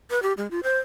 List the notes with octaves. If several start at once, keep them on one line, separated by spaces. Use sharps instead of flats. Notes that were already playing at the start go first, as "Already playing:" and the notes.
B4
G4
G#3
F4
C5